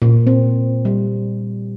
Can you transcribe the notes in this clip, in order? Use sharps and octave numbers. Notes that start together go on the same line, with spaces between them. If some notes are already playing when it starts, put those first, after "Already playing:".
A#2
C4
G3